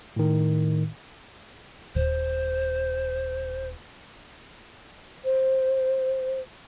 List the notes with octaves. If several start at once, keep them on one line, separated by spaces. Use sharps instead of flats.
A2 D#3
D#1 C5
C5